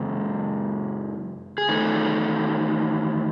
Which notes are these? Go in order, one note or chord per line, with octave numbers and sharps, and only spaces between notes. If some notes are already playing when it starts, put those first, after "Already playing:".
Already playing: F#2 C#3 G#3
G#4
E2 D#3 A3 D#4 A4